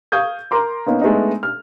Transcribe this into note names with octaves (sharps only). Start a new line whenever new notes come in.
F5 C#6 D#6 G6 G#6
A#4 A#5 C6 D6
A#3 B3 C#4 D#4
G#3 A3 B3 D4 D#4
F6